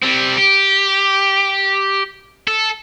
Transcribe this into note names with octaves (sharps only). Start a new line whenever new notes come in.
G3 C4
G4
A4